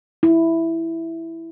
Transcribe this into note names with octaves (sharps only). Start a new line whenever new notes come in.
E4